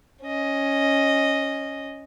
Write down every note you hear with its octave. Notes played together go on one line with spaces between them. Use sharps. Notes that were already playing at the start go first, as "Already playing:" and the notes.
C#4 D#5